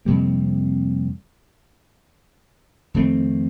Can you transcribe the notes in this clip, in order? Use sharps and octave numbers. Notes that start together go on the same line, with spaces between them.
F2 C3 G3 A#3
F2 D#3 A3 C4